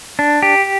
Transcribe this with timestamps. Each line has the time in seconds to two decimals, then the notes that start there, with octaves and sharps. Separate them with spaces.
0.19 D4
0.43 G4